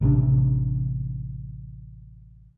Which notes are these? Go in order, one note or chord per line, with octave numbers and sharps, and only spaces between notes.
A1 C3 D#3 D4